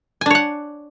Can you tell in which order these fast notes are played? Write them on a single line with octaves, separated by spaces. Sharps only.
G#5 D4 C#5 F#5